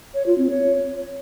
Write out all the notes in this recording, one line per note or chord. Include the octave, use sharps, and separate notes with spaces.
C#5
F4
C4
C#5